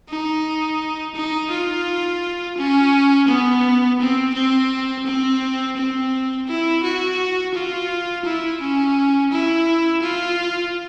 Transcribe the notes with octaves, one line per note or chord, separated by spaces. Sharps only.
D#4
D#4
F4
C#4
B3
C4
C4
C4
C4
E4
F#4
F4
E4
C#4
E4
F4